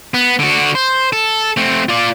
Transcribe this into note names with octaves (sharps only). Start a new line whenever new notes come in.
B3
D3 F#4
C5
A4
A3 C4
F4 D5